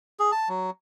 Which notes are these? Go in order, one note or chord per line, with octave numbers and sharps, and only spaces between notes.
G#4
A5
F#3